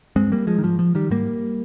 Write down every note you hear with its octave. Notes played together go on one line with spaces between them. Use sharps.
G2 G#3 C4
G3 A#3
F3 G#3
D#3
G#2 F3
F3
D#3 G3
G#2 G3 A#3